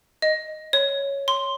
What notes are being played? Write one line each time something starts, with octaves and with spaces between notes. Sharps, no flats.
D#5
C#5
C6